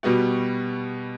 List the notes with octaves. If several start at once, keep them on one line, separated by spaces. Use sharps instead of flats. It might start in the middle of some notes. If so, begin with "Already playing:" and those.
B2 G3 B3 F#4